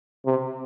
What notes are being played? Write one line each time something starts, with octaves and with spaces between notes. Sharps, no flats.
C3